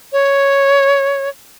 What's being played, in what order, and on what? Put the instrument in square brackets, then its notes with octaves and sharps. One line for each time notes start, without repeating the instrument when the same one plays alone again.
[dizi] C#5